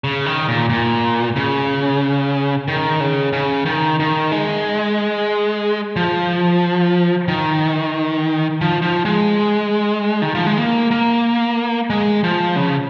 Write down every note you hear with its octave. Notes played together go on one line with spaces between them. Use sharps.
C#3
D#3
A#2
A#2
C#3
D#3
C#3
C#3
D#3
D#3
G#3
F3
D#3
F3
F3
G#3
D#3
F3
G#3
A#3
A#3
G#3
F3
C#3